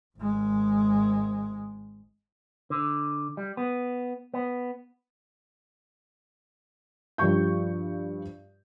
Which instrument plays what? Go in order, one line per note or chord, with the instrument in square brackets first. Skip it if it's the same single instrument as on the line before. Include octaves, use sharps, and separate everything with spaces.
[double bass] G#1 G#3
[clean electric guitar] D3
G3
B3
B3
[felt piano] G2 F3 G3 C#6 G6